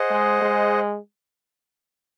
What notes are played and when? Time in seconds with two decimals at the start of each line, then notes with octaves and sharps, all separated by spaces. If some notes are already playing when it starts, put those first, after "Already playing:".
Already playing: G#4 C5 D#5 F#5
0.11 G#3
0.42 G#3